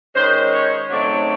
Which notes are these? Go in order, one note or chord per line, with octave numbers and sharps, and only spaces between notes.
D#3 G#3 C#4 C5
C#5
C#3 F#3 A3 C4 D#4 D5